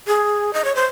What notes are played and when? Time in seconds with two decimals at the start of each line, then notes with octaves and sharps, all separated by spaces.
0.07 G#4
0.54 D#5
0.65 C#5
0.75 C5